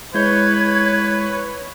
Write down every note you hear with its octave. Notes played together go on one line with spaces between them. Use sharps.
G#3 E4 B4 C#5 G6 G#6